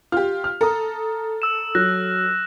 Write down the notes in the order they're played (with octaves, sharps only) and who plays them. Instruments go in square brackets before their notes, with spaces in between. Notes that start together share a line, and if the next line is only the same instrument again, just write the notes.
[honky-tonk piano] F4 G4 [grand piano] F6
[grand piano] F6
[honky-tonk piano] A4 [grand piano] A#5 D#6
[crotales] E6 E7
[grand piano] F#3 [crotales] F6 F#6 A#6